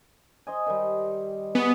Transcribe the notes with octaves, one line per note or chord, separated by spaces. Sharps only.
C5 D#5 G#5
D#3 G3
B3 F#4 G#4